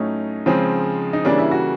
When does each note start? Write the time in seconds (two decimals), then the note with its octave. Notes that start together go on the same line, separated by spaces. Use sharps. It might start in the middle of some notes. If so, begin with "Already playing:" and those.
Already playing: A2 F#3 A3 C#4 D#4
0.46 C#3 F3 G#3 C4
1.13 D#4
1.25 C#3 E3 G3 A#3 D4
1.38 E4
1.51 F#4